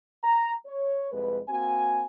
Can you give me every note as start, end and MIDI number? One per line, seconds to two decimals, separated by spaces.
0.23 0.52 82
0.66 1.08 73
1.12 1.40 36
1.12 1.40 41
1.12 1.40 56
1.12 1.40 71
1.49 2.04 58
1.49 2.04 60
1.49 2.04 66
1.49 2.04 80